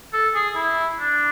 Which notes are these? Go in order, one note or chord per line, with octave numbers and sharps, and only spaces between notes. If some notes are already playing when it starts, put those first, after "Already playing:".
A4
G#4
E4
D4